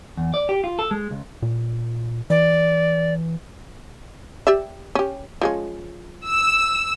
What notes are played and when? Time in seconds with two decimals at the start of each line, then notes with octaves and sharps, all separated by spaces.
0.17 E2
0.34 D5
0.49 G4
0.64 F4
0.79 A4
0.91 G#3
1.11 C#2
1.42 A#2
2.30 E3 D5
4.47 G4 D5 E5
4.95 C#4 G4
5.41 F3 G#3 C#4
6.27 E6